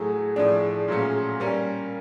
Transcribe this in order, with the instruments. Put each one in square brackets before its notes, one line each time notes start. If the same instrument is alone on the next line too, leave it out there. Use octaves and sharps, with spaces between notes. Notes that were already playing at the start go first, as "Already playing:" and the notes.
Already playing: [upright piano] A2 F#3 A3 [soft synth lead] G#4
[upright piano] A2 F3 A3 D4
A#2 F#3 A3 C#4
G3 A#3 C#4